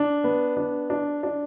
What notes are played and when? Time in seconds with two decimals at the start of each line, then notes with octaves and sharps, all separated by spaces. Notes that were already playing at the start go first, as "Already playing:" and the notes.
Already playing: D4
0.24 B3
0.57 D4
0.90 D4
1.23 D4